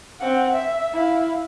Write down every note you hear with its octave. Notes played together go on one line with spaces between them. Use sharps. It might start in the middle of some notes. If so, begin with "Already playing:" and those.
C4 F#5
E5
E4 F5